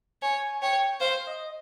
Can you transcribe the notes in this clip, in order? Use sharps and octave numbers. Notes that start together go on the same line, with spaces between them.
C#5 G#5
C#5 G5
C5 F5
D#5